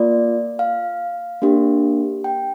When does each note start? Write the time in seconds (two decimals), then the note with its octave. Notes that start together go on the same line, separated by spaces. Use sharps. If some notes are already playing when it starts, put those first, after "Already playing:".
Already playing: A#3 F4 D5
0.59 F5
1.42 A#3 D4 G4
2.24 G5